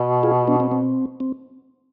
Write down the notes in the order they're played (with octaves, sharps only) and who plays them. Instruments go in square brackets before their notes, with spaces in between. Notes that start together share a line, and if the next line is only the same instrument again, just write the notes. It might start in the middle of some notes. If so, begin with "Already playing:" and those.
Already playing: [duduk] B2
[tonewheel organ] F4 G#4
B3 D4
C4
C4
C4